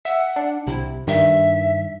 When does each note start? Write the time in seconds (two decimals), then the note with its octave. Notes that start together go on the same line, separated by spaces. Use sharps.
0.05 E5 F#5
0.36 D4
0.67 C2 C3 E4
1.07 G2 D#3 E5